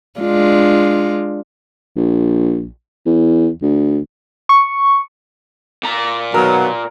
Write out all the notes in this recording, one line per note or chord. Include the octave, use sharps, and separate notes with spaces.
G#3 D4 F4
A#1
E2
D2
C#6
A#2 A#5
B2 D#3 F#3 A#4